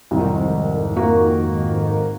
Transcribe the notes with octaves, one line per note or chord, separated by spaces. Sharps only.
C2 F2 G#2 D#3
A#3 F#4